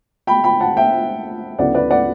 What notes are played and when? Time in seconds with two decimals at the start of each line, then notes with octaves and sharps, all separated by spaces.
0.27 G5 B5
0.44 G5 B5
0.60 F#5 A5
0.76 E5 G5
1.59 D2 C#3 F#3 B3 E4 D5 F#5
1.75 B4 D5
1.91 D5 F#5